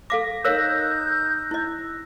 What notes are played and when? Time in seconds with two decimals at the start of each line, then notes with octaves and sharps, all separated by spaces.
0.10 A4 F5 D6 A#6
0.45 D#4 A#4 C#5 F5 E6 F#6 G6 A#6
1.51 E4 D#5